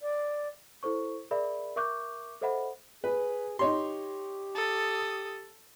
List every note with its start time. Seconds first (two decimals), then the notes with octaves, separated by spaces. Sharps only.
0.01 D5
0.83 E4 A4 C5 C#6
1.31 G#4 A#4 D5 E5 B5
1.76 A#4 E5 C#6 D6 F#6 G6
2.41 A4 C5 D#5 E5 F#5 B5
3.04 G#4 B4
3.59 D#4 G4 C#5 C6
4.55 A4 D#6